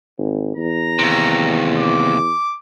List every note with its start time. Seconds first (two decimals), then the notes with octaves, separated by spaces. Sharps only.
0.18 G#1
0.57 E2 A#5
0.99 D#2 C3
1.79 D6